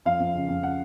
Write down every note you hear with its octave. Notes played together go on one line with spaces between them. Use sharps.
F2 F5
F2
C#3
F2
F#5